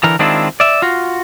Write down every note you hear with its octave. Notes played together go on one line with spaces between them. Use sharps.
D3 E3 A#4
D#3 G#3 C4 D4 E4 F4
D5 E5
F4 F#4